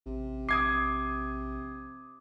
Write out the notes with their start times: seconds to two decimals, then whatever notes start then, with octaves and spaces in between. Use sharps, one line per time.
0.06 A1 C3
0.49 A#1 D6 D#6 G#6 C7